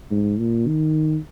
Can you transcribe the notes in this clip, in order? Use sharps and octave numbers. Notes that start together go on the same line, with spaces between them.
G#2
A#2
D#3